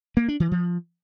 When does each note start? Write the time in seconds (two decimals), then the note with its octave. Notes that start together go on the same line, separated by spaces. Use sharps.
0.17 A#3
0.28 D4
0.40 E3
0.52 F3